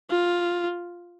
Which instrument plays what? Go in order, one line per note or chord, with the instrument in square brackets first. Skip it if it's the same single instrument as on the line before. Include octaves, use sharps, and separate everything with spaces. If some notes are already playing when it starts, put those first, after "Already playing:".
[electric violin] F4